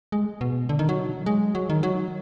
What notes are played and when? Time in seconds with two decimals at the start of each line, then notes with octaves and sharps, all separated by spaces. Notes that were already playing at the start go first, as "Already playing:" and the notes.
0.12 G#3
0.41 B2
0.69 D3
0.79 D#3
0.89 F#3
1.26 G#3
1.55 F#3
1.70 D#3
1.83 F#3